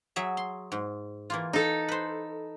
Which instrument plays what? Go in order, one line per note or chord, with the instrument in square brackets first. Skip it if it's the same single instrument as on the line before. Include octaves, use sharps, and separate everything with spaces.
[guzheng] F#3 G#4 E5
C6
G#2
E3 A#3 F4
[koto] D#4 A4
[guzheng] B4 C5